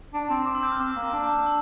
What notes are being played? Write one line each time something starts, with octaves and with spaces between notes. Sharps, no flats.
D4
C4
D6
E6
G6
F6
C4 D6
A#3
D4
E6